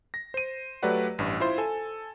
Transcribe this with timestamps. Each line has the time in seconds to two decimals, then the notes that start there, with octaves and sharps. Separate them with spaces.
0.14 A#6
0.34 C5 D#7
0.83 F#3 A3 G4 B4 D5 F#5
1.18 A1 G2
1.40 E4 F4 C5 C6
1.58 A4 G#5